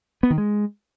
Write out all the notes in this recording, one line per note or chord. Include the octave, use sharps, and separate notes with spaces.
B3
D#3
G#3